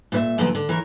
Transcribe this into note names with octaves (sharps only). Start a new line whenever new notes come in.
A#2 B4 E5
F#2 A#2 D3 F3 B3 A4
D3
E3 A#4 C#5